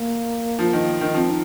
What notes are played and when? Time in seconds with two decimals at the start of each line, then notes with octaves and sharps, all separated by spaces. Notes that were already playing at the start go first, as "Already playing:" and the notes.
Already playing: A#3
0.59 F3
0.73 D#3
1.01 D#3
1.14 F3 C4
1.29 D#4